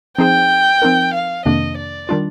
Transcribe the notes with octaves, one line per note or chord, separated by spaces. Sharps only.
F3 C4 D#4 G#4 C5 G5
F3 C4 D#4 A#4
F5
F2 C3 D#3 A#3 D4 D#5
D5
D#3 G3 D4 F4